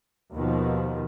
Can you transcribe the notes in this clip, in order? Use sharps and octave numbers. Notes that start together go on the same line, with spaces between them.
D#2 B2 D#3 F3